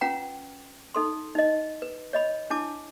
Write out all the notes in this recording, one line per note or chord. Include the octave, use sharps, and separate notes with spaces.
C#4 F4 B4 F#5 G5 A#5
D#4 A4 C6
D#4 D#5
B4
C#5 D#5 B5
D4 E4 A5 D6